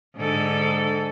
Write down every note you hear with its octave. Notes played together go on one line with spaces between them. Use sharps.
G#2 D3 A4